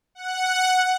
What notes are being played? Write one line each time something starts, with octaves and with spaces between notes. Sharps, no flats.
F#5